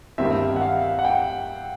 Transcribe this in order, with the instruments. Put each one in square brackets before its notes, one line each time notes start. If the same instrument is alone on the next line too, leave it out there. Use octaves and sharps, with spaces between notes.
[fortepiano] G2 D#3 G3 C4 E4 [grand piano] E5
[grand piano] F#5
F5
F#5
G5